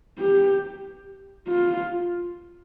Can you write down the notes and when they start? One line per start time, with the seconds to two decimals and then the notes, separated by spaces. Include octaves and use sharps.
0.19 G4
1.49 F4